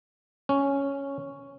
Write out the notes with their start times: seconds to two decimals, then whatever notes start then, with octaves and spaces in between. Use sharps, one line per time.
0.49 C#4